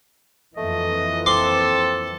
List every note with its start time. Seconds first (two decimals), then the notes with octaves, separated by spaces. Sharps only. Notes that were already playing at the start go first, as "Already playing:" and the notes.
0.57 F2 E3 A3 A#3 D#5
1.26 C4 A4 C6 D6